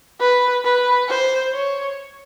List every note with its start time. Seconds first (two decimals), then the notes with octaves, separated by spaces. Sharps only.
0.20 B4
0.64 B4
1.09 C5
1.53 C#5